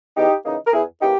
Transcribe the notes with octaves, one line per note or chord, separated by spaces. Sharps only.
E2 D#4 G4
C#3 E3 A#3 D#4
A#4
E2 E4 G#4
C#3 E3 A#3 D#4 G4